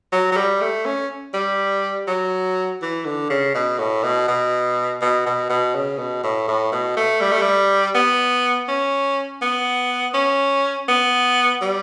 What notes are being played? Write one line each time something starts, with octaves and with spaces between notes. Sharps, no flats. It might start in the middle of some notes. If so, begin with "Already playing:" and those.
F#3
F#3
G3
A3
C#4
G3
F#3
E3
D3
C#3
B2
A2
B2
B2
B2
B2
B2
C#3
B2
A2
A2
B2
A3
G3
A3
G3
B3
C#4
B3
C#4
B3
G3